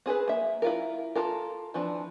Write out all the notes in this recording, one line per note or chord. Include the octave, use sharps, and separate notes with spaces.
C4 G#4 A4 B4
A#3 E5
E4 F4 A#4
F4 A4 A#4
E3 F3 C4 D4